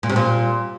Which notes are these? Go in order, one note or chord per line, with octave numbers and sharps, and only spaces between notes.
A#2
C3
A#2